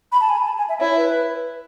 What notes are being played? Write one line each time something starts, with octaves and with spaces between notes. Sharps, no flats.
B5
A5
G#5
B5
A5
G#5
E5
E4 C#5
B4